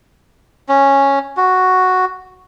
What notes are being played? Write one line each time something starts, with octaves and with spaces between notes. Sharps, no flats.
C#4
F#4